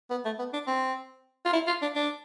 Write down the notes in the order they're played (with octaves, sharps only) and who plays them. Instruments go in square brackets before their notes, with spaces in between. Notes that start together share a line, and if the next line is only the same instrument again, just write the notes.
[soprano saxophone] B3
A3
B3
D4
C4
F4
E4
F4
D4
D4